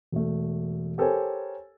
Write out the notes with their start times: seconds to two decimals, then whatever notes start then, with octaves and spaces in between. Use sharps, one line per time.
0.12 E1 A3
0.98 G4 A4 A#4 C5 C#5 G#5